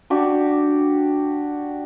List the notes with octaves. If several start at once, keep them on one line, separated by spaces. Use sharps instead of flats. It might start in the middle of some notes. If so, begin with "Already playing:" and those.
D4 F#4 G4